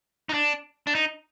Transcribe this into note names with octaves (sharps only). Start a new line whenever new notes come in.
D#4
D4
D4
D#4